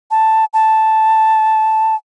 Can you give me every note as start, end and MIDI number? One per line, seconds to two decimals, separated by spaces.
0.11 0.45 81
0.54 1.95 81